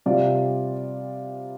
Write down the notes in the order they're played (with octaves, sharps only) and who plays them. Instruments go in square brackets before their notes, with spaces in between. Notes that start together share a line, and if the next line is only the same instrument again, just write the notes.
[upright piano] C3 G3 F4 D5